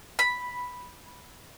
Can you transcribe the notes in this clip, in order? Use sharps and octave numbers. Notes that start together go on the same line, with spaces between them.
B5